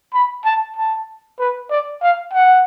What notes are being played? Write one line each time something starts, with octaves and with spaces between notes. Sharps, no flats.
B5
A5
A5
B4
D5
F5
F#5